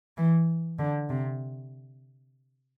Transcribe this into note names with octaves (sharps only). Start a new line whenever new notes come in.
E3
D3
C3